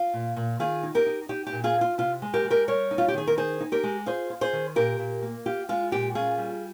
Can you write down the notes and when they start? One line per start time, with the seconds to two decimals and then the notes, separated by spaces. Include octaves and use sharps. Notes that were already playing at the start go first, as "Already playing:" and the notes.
Already playing: F4
0.13 A#2
0.36 A#2
0.59 D#3 F4 G#4
0.83 D#4
0.95 G4 A#4
1.06 D#4
1.29 D#4 G4
1.47 G4
1.52 A#2
1.64 F4 G#4
1.75 D#4
1.81 F4
1.98 C3 F4
2.22 G#3
2.33 G4 A#4
2.45 G#3
2.50 G4 A#4
2.68 G3 A#4 C#5
2.91 D#4
2.98 F4
3.08 G4
3.14 D#3 G#4
3.27 A#4
3.37 D#4 G#4 C5
3.60 D#4
3.72 G4 A#4
3.83 G#3
4.06 F4 G#4 C5
4.30 F4
4.41 G#4 C5
4.53 D#3
4.75 A#2 G4 A#4
4.99 A#2
5.22 A#3
5.46 F4 G4
5.69 G#3 F4
5.91 A#2 G4
6.15 C#4 F4 G#4
6.38 G3